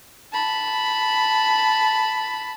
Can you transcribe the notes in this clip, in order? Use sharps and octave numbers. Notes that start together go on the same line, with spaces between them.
A5 B5